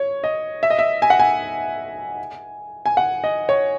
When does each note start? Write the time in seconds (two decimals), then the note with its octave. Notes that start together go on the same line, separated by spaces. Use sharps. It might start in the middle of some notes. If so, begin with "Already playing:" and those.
Already playing: C#5
0.24 D#5
0.63 E5
0.70 D#5
0.79 E5
1.02 G#5
1.10 F#5
1.20 G#5
2.86 G#5
2.97 F#5
3.24 D#5
3.49 C#5